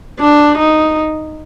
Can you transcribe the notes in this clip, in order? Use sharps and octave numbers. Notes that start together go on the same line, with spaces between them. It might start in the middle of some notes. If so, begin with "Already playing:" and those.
D4
D#4